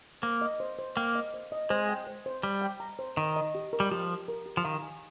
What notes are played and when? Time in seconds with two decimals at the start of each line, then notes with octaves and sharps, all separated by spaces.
0.22 A#3 C5
0.41 D#5
0.60 C5
0.79 C5
0.96 A#3 G5
1.15 D#5
1.34 C5
1.52 D#5
1.70 G#3 C5
1.89 G5
2.07 C5
2.26 C5
2.43 G3 C5
2.62 G5
2.80 A#5
2.99 C5
3.17 D#3 D#5
3.36 D#5
3.55 G4
3.73 A#4
3.80 G3
3.91 F3 G4
4.09 A#4
4.28 A#4
4.46 G4
4.57 F3
4.64 D#3 F5
4.83 G#5